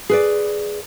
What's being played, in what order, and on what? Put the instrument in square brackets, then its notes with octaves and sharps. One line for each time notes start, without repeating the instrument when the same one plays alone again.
[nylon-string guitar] G#4 B4 D5